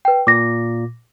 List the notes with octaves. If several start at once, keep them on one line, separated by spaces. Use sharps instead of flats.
B4 G5
A#2 D6 A#6